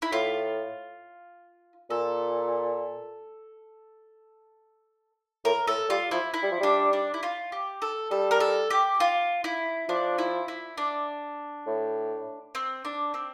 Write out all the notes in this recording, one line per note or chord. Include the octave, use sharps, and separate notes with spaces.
E4
A2 F4
A#2 A4
A2 A#4
A2 A4
G3 F4
F3 E4
E4
G3
F3
G3 D4
D4
E4
F4
G4
A4
G3 A4
A#4
A4
G4
F4
E4
F3 D4
E4
E4
D4
A2
C4
D4
C4